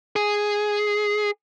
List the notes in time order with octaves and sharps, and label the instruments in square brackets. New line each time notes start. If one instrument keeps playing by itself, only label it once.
[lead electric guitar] G#4